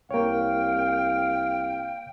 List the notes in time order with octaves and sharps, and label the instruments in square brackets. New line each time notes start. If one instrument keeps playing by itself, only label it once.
[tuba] C2 [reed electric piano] A#3 C#5 [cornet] F5 [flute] G5